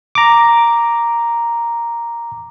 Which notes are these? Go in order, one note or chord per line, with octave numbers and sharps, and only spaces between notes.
A#5 D6